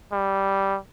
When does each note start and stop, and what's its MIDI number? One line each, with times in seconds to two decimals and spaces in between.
0.12 0.78 55